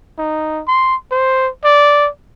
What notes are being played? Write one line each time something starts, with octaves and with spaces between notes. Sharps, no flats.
D#4
C6
C5
D5